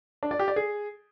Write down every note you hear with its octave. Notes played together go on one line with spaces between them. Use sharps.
D4
D5
G4
D5
G#4